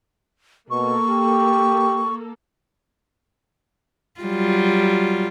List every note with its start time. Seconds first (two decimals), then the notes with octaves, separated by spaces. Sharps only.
0.70 B2 A#3 A4 C#6
1.09 G4
4.21 F#3 G3 F4